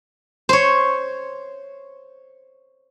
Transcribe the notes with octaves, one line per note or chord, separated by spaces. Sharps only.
C5 C#5